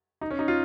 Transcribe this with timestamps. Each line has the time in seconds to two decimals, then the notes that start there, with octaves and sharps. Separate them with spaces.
0.21 D#4
0.30 C#4
0.39 D#4
0.48 F4